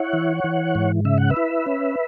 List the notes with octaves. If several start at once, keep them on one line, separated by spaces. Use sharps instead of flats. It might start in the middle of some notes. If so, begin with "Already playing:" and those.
Already playing: E4 C#5 F#5
E3
E3
G#2
C#3 E5
F#5
B4 E5
E4
C#4